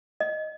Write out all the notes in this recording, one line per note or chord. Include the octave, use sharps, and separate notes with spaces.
D#5